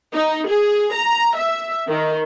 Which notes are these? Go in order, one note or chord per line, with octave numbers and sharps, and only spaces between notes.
D#4
G#4
A#5
E5
D#3